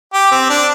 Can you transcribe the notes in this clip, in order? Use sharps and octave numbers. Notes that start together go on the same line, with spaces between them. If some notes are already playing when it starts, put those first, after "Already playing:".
G4
C4
D4